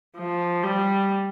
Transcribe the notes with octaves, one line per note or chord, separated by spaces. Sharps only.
F3
G3